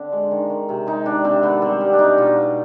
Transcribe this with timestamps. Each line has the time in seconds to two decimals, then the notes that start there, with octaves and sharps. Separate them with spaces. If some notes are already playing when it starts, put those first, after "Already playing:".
Already playing: D3 C4 D4
0.12 G#3
0.31 D#3
0.50 D#3
0.69 C3
0.87 G#3 D#4
1.06 D#3 D4
1.24 C3 C4
1.43 D#3 B3
1.62 G3 C4
1.81 G3
1.93 D4
1.99 B2 D#4
2.18 B2 F4
2.37 B2